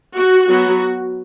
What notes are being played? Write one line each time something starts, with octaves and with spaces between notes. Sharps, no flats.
F#4
F#3 B3 F#4